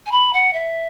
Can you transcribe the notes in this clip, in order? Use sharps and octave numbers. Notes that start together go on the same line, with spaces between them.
G#5
B5
F#5
E5